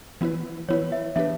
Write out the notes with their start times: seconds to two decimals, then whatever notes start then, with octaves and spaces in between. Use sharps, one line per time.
0.21 E3 B3 E4 B4
0.69 E3 B3 E4 B4 C#5
0.92 E5
1.16 E3 B3 D4 G4 B4 E5